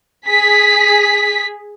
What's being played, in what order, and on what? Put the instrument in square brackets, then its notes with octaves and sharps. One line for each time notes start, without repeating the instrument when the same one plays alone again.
[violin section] G#4 B6